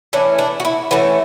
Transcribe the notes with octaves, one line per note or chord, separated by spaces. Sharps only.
E3 A3 C#4 D4
D4
F#4
E4
E3 A3 C#4 F#4